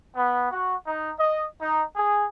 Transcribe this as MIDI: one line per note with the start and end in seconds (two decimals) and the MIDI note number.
0.16 0.49 59
0.52 0.76 66
0.87 1.12 63
1.18 1.45 75
1.61 1.84 63
1.97 2.28 68